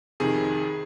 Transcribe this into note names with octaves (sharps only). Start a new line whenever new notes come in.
F2 C3 D#3 G#4